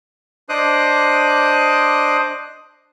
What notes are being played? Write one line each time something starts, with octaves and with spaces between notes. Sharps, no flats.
D4 C5 D#5 D6 D#6 F#6